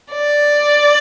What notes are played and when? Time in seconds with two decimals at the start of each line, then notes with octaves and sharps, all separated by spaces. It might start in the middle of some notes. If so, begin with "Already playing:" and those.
0.12 D5